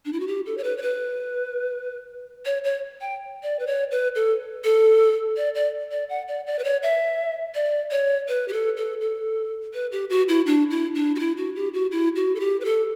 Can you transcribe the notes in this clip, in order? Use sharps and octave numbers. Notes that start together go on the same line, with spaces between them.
D4
E4
F#4
G4
A4
C#5
B4
C#5
B4
C#5
C#5
G5
D5
B4
C#5
B4
A4
A4
D5
D5
D5
F#5
D5
D5
B4
C#5
E5
D5
C#5
B4
G4
A4
A4
A4
B4
G4
F#4
E4
D4
E4
D4
F#4
E4
F#4
G4
F#4
E4
F#4
A4
G4
B4
A4